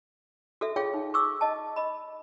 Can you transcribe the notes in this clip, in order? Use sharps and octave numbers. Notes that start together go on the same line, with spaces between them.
F#4 A4 E5
F4 G#4 C#5 F5 G5
D#4
C#6 D6 E6
D#5 A5
D#5 B5